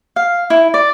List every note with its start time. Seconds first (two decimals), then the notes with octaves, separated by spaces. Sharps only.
0.16 F5
0.50 E4
0.74 D5